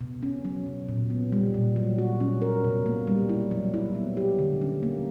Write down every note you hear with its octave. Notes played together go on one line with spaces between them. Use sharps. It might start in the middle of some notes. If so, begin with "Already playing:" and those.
B2
C#4
F#3
B2
A#2
B3
G3
A#2
F#3
F#4
C#4
A#4
B2
A#3
G3
E4
F#3
E4
B3
G4
D3
C#4
A#3